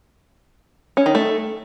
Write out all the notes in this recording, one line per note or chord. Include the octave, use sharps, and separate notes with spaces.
C#4
D#3
A3